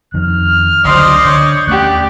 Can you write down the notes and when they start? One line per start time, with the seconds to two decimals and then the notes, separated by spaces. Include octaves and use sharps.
0.14 F2 D#3 F6
0.85 C#2 D3 F#3 C5 D5 D#5 C6
1.25 D3 C#5 G6
1.67 D#2 A3 C#4 G4 D5 F#6